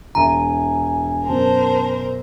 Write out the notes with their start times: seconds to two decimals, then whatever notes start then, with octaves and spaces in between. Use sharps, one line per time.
0.15 E1 E5 G#5 A#5
1.27 F#2 B2 A#4 C5 A5